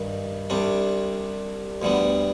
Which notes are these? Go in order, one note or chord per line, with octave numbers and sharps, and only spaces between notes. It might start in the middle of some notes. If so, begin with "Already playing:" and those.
Already playing: G2 D#3 G3
C2 C3 G3 D4
D2 D3 G3 B3